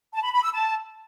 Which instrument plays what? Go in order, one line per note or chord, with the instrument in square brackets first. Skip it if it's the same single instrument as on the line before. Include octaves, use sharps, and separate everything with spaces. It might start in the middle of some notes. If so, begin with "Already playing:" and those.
[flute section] A5
B5
B5
E6
A5